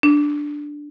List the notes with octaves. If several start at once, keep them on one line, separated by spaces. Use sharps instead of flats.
D4